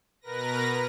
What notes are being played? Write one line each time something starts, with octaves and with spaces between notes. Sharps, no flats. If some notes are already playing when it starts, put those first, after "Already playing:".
B2 A#4 B4 A#6